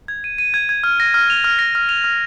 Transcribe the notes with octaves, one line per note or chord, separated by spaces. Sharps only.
G#6
D#7
D#7
G#6
G#6
F6
A#6
F6
F7
F6
A#6
F6
F7
F6